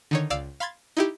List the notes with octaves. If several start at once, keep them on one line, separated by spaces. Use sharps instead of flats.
D3 D#3 C#5
C#2 D5 F5 E6 F6 A6
F5 B5 C6 G#6 A6
D#4 E4 G4